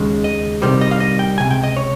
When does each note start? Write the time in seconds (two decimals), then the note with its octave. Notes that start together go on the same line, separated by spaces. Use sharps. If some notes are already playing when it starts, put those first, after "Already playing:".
Already playing: D#2 C#3 G#3
0.24 D#5
0.62 C2 C3 D#3 G3 C5
0.81 D#5
0.91 F5
1.00 D#5
1.19 G5
1.38 C#2 C3 G#5
1.51 G5
1.63 D#5
1.77 C#5